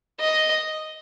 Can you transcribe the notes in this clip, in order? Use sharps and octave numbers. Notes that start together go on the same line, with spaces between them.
D#5